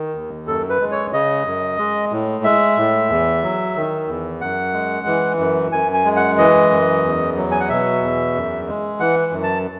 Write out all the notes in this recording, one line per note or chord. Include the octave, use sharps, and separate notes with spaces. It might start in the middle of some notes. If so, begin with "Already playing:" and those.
Already playing: D#3
D#2
F#2 A4
B4
G#3
C#5
C#3 D#5
F#2
G#3
A2
G#3 E5
A2
E2
F#3
D#3
E2
F#2 F#5
G#3
E3
F#2
F#2 G#5
G#5
G#3
F#5
E3 D#5
F#2
E2
F#3
G#5
F#5
B2 E5
E2
F#2
G#3
E3 F#5
F#2
A5